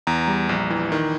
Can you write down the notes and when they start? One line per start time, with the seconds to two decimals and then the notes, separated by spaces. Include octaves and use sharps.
0.07 E2 A#5
0.27 G3
0.49 A#1
0.70 E3
0.92 D#3